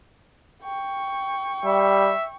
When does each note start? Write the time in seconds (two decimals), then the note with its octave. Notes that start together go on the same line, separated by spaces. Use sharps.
0.63 G5 C#6
1.65 G3 E5